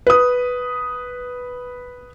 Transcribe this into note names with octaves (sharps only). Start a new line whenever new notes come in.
B4 D#6